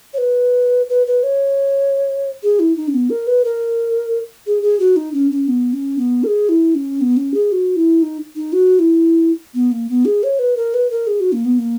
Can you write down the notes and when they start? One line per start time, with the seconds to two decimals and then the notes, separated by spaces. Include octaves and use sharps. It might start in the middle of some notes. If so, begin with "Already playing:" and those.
0.14 C#5
0.18 B4
0.89 B4
1.07 B4
1.23 C#5
2.43 G#4
2.59 E4
2.76 D#4
2.88 C#4
2.94 B3
3.10 A#4
3.27 B4
3.44 A#4
4.46 G#4
4.62 G#4
4.80 F#4
4.96 D#4
5.13 C#4
5.31 C#4
5.48 B3
5.73 C#4
5.98 B3
6.24 A#4
6.27 G#4
6.49 E4
6.75 C#4
7.01 B3
7.17 C#4
7.34 G#4
7.52 F#4
7.76 E4
8.02 D#4
8.36 D#4
8.53 F#4
8.79 E4
9.54 B3
9.72 A#3
9.89 B3
10.05 G#4
10.23 C#5
10.39 B4
10.57 A#4
10.74 B4
10.91 A#4
11.07 G#4
11.20 F#4
11.32 A#3
11.45 B3
11.59 A#3